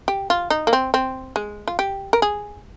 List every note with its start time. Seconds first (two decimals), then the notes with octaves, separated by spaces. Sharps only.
0.08 G4
0.30 F4
0.50 D#4
0.67 A#3
0.73 C4
0.94 C4
1.36 G#3
1.68 F4
1.79 G4
2.13 A#4
2.22 G#4